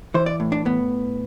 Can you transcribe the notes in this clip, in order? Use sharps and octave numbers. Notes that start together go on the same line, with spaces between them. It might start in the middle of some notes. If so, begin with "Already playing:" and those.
E3 C5
D5
A2
D4
A2 B3